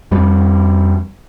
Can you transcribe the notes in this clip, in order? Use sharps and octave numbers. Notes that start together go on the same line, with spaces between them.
F2 G3